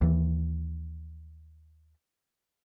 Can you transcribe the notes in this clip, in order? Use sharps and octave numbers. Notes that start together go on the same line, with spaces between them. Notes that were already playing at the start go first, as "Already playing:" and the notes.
D#2 E3